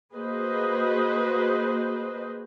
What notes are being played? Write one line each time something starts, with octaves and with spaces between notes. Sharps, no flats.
A#3 F#4 G#4 B4 C5 D#5